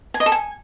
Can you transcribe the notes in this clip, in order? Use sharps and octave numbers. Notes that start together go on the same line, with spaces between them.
G#5
D#5
A4
G#5